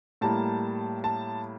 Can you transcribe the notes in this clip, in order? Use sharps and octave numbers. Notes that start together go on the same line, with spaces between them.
A2 G3 A#3 A5
A5